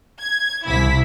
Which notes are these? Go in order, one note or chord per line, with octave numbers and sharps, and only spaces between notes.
G#6
C2 E4 B6